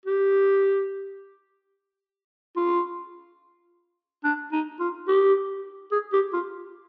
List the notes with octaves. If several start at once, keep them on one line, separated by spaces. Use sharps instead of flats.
G4
F4
D4
D#4
F4
G4
G#4
G4
F4